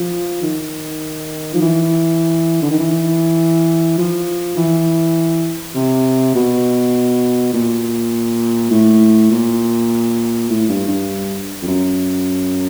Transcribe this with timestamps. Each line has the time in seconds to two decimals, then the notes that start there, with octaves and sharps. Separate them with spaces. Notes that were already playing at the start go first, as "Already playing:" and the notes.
Already playing: F3
0.42 D#3
1.54 F3
1.61 E3
2.62 D3
2.71 D#3
2.80 E3
3.98 F3
4.57 E3
5.75 C3
6.35 B2
7.54 A#2
8.71 A2
9.31 A#2
10.49 A2
10.69 G2
10.88 G2
11.62 F2
11.67 F#2